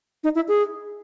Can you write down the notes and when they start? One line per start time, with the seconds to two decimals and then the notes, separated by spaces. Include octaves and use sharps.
0.24 D#4
0.35 E4
0.48 G#4